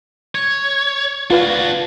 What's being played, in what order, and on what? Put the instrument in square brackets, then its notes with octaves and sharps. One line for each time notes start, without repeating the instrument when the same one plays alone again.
[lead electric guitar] C#5
[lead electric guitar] D4 F#4 [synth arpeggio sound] F4 B4 F5